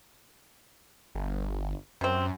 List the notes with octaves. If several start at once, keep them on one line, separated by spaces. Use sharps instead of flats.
G1
F#2 C3 C4